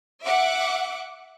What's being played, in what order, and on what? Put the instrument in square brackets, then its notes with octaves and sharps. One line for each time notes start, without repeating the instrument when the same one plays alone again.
[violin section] E5 F#5 D6